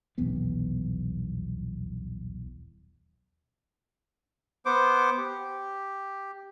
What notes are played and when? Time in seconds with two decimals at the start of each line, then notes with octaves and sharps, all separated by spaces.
0.18 D#1 B1 E2 B3
4.66 B3 C5 D6
5.18 G4